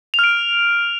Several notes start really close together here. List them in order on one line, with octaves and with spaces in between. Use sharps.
F7 F6 D7